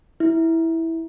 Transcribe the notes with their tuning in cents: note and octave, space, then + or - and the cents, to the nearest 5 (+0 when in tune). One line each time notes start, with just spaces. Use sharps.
E4 -10